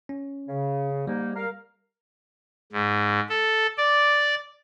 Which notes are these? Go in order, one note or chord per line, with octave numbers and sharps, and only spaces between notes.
C#4
C#3
G#2 G3 A#3 D#4
A#4 F5
G#2
A4
D5